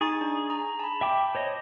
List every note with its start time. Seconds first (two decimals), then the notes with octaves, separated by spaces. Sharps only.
0.01 D#4 G#4 C#6 A6
0.21 D4
0.50 A#5
0.79 A5 B5
1.01 E5 G5 D6
1.35 C5 C#5 D#5